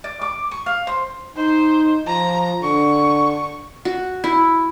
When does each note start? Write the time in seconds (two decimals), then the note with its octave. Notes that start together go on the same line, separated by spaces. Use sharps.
0.04 D5
0.21 D6
0.51 C#6
0.66 F5
0.87 C5
1.37 D#4 C5
2.06 F3 A#5
2.63 D3 C#6
3.85 F#4
4.24 E4